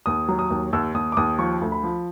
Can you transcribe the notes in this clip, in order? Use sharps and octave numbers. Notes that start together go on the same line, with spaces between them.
D#2 D#6
F#3
D#6
D#2
D#2 E6
D#2 D#6
D6
D#2 D#6
F3 C#6
D2
B5
F3